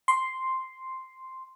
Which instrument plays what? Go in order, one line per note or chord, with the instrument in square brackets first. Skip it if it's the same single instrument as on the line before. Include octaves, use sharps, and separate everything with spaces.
[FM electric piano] C6